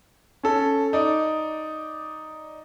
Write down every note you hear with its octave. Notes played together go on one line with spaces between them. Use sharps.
C#4 A4
D#4 D5